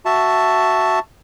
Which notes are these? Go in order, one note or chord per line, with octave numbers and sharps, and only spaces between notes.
F#4 E5 A5